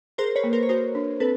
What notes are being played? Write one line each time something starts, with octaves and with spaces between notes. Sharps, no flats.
G#4 A#4 C5
B4 C#5
A#3
A#4 C5
C#5
F#4 A#4 C5
D4
C4 A4 B4